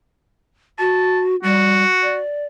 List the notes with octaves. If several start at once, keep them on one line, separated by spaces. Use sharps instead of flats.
F#4 A5
G3 F#4
D5